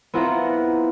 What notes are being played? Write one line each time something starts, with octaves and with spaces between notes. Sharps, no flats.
B3 C4 E4 F4 F#5 A#5